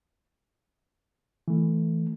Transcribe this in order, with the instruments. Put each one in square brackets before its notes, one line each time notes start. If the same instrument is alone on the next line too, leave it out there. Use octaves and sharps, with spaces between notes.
[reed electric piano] E3 A3